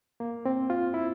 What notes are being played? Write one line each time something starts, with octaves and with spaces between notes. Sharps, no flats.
A#3
C4
F4
E4